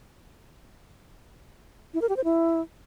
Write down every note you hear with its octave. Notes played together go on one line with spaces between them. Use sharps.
E4
A#4
G4
C5
E4